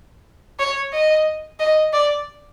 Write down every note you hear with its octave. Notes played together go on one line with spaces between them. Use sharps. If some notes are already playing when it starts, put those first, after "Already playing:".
C#5
D#5
D#5
D5